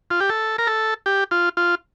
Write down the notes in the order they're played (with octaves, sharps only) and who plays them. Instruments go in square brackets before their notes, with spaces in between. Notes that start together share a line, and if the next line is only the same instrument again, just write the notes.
[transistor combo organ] F4
G4
A4
A#4
A4
G4
F4
F4